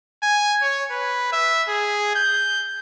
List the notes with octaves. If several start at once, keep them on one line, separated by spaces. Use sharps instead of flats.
G#5
C#5
B4
E5
G#4
G6